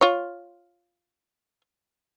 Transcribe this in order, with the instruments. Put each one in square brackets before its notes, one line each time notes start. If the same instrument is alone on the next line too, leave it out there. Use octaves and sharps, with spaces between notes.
[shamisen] F4 C#5